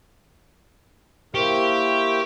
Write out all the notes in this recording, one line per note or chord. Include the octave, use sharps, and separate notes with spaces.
A#3 E4 G4 A#4 C5 C#6